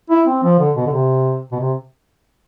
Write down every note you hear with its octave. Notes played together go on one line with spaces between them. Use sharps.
E4
C4
F3
D3
B2
D3
C3
B2
C3